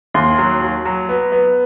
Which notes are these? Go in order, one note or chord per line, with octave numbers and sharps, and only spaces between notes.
D#2 C6
F#3
F#3
F#3
B3
B3